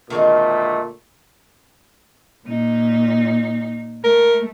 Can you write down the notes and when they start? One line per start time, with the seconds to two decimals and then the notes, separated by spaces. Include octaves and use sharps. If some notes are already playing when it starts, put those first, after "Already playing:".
0.10 D2 A#2 D#3 G#3 A3 C4
2.46 A#2 D#4
4.04 A3 A#4